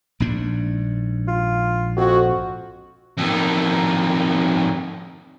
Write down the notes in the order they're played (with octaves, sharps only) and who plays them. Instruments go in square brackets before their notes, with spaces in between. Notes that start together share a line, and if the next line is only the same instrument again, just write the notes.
[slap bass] A#1 G#2 D4
[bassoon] F4
[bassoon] F2 [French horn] F#4
[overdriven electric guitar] F2 D#3